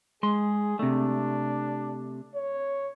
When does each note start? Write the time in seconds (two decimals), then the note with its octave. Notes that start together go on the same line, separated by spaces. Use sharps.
0.23 G#3 G#4 C6
0.79 C3 A3 D4
2.35 C#5